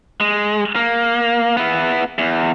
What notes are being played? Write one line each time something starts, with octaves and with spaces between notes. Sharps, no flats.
G#3
A#3
B3 E4
E2